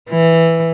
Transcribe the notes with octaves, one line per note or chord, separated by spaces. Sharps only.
E3